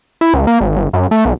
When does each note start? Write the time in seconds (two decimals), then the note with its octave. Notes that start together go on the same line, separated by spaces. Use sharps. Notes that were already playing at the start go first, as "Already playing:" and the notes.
0.21 E4
0.34 C#2
0.47 A#3
0.61 G#1
0.76 G1
0.93 F#2
1.11 A3
1.25 B1